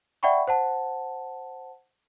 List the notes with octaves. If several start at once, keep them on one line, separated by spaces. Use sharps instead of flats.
D5 E5 F#5 G5 B5 C#6
C5 F#5 A5